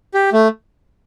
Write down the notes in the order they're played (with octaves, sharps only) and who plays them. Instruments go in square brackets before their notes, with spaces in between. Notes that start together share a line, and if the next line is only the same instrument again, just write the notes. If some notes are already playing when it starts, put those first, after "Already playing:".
[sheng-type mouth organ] G4
A3